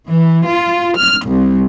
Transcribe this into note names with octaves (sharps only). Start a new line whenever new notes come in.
E3
F4
F6
C2